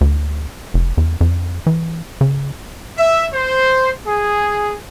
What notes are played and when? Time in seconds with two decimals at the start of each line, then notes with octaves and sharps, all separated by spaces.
0.01 D2
0.74 F1
0.97 E2
1.21 F2
1.67 E3
2.21 C#3
2.98 E5
3.34 C5
4.06 G#4